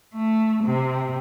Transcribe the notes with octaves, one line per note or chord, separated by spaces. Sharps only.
A3
C3